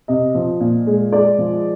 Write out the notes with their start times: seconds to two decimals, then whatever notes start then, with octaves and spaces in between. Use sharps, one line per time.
0.08 C3 D#5
0.35 F3
0.60 A#2
0.87 G#3
1.12 G#3 D5
1.38 F3